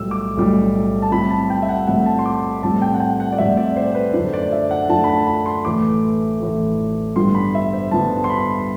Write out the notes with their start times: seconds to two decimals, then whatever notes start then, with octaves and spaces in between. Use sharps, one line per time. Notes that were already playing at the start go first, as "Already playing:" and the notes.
Already playing: B1 A2 G3 E6
0.11 D6
0.37 B1 A2 G3
1.02 A5
1.12 A2 G3 C4 E4 B5
1.30 A5
1.50 G5
1.62 E5
1.69 F#5
1.87 A2 G3 C4 E4 F#5
2.06 A5
2.19 C6
2.26 D6
2.63 A2 G3 C4 A5
2.82 G5
2.94 F#5
3.00 G5
3.20 F#5
3.32 D5
3.38 A2 G3 C4 E5
3.57 D5
3.77 C5
3.95 B4
4.14 F#2 D3 A3 D4 C5
4.34 D5
4.52 E5
4.71 F#5
4.89 F#2 D3 A3 D4 A5
5.04 B5
5.09 A5
5.27 B5
5.46 C6
5.65 A1 A2 E3 A3 D6
6.41 A1 A2 E3 A3
7.16 G2 D3 G3 B3 C6
7.35 B5
7.55 E5
7.73 C5
7.91 G2 D3 G3 B3 A5
8.24 C6
8.30 B5